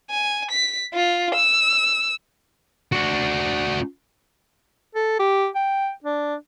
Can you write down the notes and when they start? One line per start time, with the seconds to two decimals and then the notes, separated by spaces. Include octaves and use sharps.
0.10 G#5
0.51 B6
0.94 F4
1.35 E6
2.93 D4 F#4
4.95 A4
5.19 G4
5.55 G5
6.04 D4